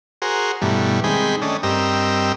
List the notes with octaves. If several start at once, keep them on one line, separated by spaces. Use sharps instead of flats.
F#4 G#4 A#4 C5
G2 B2 E3 G3 A3
D#3 G#3 C4 G#4 G5 B5
A3 C#4 D4 D#5
G2 C4 G4 A#4 D#5 E6